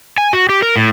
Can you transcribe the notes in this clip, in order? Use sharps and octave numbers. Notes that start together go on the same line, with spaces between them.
G#5
F#4
G4
A#4
A2